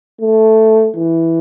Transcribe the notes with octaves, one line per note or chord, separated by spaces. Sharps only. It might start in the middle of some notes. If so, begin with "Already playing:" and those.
A3
E3